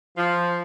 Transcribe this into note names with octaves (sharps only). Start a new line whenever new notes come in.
F3